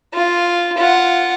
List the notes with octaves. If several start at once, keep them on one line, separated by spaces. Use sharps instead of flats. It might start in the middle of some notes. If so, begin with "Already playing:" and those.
F4
F4 F#5